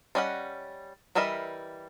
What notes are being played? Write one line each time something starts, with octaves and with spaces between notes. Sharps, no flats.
G3 C#4 D#5 F5 F#5
E3 G3 A#4 D#5 E5